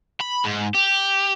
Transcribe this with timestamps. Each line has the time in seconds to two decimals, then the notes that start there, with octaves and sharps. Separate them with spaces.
0.20 B5
0.44 G#2
0.74 G4